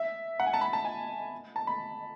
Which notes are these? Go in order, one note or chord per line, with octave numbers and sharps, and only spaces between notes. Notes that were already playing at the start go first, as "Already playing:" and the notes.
Already playing: E5
F#5
G#5
A5
B5
A5
G#5
A5
B5